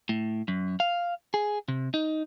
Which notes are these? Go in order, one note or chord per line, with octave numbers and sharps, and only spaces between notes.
A2
F#2
F5
G#4
C3
D#4